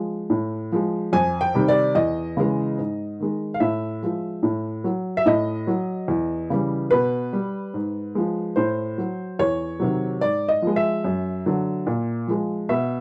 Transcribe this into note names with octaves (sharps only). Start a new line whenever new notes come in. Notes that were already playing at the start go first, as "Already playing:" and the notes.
Already playing: F3 G#3
A2
F3 G#3
F2 G#5
G5
C3 D#3 G3
D5
E2 D#5
C#3 E3 G#3
G#2
D#3 G#3
F5
A2 E5
F3 G#3
A2
F#3
E5
A2 D#5
F#3
E2
C#3 E3 G3
B2 B4
G3
G#2
F3 G#3
A2 C5
F#3
E2 C#5
C3 D#3 F#3
G#2 D5
D#5
F3 G#3
E5
F#2
D3 F#3
A#2
F3 G#3
B2 E5